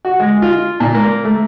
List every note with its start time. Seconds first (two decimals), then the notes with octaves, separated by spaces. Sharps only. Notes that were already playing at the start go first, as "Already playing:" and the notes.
0.05 F#4
0.20 G#3
0.42 F4
0.80 A#2
0.94 A#3
1.25 A3